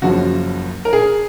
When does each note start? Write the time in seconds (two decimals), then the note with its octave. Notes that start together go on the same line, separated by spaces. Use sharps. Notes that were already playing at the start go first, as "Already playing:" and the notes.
0.02 F#1 F#2 F3 F#4
0.85 A#4
0.93 G#4